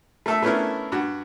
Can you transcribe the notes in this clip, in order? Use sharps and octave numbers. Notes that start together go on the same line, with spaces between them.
A3 A4 E5
A3 B3 C#4 D4 E4 A#4
G2 F#4